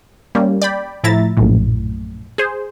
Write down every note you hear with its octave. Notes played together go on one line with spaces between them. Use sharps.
G3 A#3 C#4
D5 G5 B5
A2 F3 E4 E5 A#5 A6
A#1 F#2 A2
G#4 C5